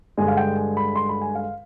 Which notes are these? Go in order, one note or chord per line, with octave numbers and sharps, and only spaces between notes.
G2 D3 G#3 G#5
F5
G5
G#5
B5
C6
B5
G#5
F5